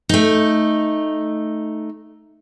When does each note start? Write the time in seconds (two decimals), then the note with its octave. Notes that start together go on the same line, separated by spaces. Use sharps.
0.09 A3 D#4